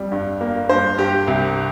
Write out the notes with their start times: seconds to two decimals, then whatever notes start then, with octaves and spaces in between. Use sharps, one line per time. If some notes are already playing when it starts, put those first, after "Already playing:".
Already playing: F2 G3
0.12 G2
0.41 A#3
0.69 G2 C5
0.98 G2 G4
1.27 C2